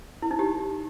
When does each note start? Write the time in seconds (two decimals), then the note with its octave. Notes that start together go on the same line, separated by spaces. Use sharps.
0.22 E4
0.31 D#4
0.39 G4